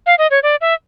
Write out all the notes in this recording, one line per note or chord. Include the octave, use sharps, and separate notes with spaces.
F5
D#5
C#5
D5
E5